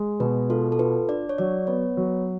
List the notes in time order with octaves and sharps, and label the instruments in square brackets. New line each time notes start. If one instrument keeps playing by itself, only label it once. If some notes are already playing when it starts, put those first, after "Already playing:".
Already playing: [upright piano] G#3
[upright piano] B2 [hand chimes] B4
[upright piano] F4 [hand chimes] A4
[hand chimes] A4
[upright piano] F4 [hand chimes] B4
[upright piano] D4 [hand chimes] D5
[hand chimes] C#5
[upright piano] F#3 [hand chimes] D5
[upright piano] B3 [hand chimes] C#5
[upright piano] F#3